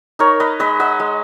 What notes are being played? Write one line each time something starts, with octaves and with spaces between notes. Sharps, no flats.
D#4 A#4 C#5
B4 D#5
G#3 B4 D#5
D#5 F#5
G#3